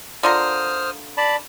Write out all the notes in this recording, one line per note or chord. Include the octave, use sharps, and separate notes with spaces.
D3 F4 A#4 C5 D#6 F6
D5 A5 B5